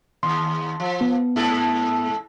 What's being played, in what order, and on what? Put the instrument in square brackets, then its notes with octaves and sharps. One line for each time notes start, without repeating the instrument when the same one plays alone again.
[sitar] D#2 [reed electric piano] C6
[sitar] F3
[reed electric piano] B3
[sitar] G#2 E4 A4